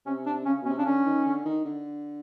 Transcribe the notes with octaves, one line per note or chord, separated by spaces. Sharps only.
C3 C#4
D4
C#3 C#4
B2
C#4
C3
C#3 D4
D3 C#4
D#3
D3
D#3
D3